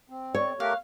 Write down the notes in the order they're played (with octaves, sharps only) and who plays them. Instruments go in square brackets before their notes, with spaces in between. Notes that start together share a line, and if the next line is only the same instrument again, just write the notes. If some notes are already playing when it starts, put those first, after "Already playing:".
[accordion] C4
[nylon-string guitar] C#5 [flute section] D5 G5 C#6
[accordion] A3 G4 A#4 [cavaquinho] F5 [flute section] C#6 F#6